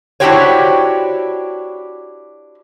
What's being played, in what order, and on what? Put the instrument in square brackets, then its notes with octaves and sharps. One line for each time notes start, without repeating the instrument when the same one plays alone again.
[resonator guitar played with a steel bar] D4 E4 F#4 G4 C5 C#5